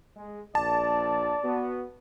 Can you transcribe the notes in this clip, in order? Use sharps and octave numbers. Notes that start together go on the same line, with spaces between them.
G#3
A#1 D5 A5
B3 F#4